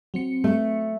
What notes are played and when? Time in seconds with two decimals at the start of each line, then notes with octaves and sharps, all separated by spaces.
0.14 F#3 C4 C#7
0.44 A3